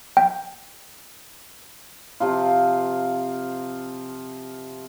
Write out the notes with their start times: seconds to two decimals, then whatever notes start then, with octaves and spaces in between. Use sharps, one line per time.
0.17 G5
2.20 C3 F3 F4